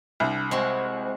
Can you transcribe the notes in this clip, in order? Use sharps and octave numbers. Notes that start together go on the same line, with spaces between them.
C2 D4
G#3 C4 F#4 C5